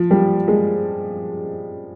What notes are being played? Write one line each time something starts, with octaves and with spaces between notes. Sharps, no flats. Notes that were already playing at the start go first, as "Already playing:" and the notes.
Already playing: F3
G3
G#3